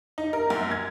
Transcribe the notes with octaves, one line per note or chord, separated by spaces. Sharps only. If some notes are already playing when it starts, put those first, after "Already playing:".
D#4
A#4
F#2
G#6